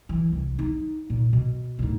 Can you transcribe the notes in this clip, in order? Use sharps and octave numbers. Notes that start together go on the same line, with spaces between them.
E3
C2
D#4
A#2
B2
D2 G#2